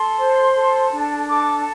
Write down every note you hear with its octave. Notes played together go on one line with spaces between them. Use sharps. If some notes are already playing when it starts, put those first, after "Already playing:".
Already playing: A4 C6
C5
A4
D4
A4 D6